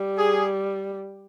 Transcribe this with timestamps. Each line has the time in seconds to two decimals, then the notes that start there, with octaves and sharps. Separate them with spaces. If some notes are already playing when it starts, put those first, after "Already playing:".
Already playing: G3
0.17 G#4